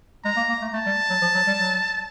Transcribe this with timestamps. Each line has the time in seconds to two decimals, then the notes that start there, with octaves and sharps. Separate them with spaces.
0.24 G#3 A#5
0.37 A#3
0.49 A#3
0.62 A3
0.73 A3 A5
0.86 G3
1.10 F#3
1.21 F3
1.35 F#3
1.47 G3
1.59 F#3